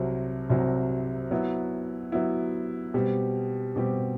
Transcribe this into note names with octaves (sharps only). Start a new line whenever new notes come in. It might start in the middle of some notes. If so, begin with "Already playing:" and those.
Already playing: C2 C3 F#3 C4
C2 C3 F#3 C4
F#3 B3 E4
F#3 B3 E4
B2 G3 C4 G4
B2 G3 C4 G4